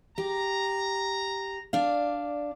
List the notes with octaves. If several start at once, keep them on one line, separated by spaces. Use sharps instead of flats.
G4 A#5
D4 D5 F5